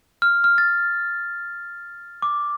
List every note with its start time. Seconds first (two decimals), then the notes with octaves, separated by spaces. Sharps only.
0.22 F6
0.44 F6
0.58 A6
2.22 D6